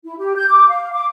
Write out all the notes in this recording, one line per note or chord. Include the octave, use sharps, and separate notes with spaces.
E4
G4
G6
D6
F5
D6